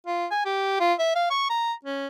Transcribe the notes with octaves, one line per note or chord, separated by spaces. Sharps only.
F4
G#5
G4
F4
E5
F5
C#6
A#5
C#4